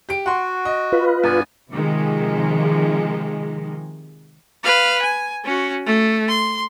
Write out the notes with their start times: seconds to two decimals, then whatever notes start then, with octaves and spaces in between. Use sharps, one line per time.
0.09 G4 D7
0.26 F#4 F#5 C6
0.65 D#5
0.92 F4 B4
1.24 G2 B3 D5 G#5
1.71 C3 D#3 F3 G#3
4.64 B4 F5
5.02 G#5
5.44 C#4 F#4
5.86 A3
6.28 C6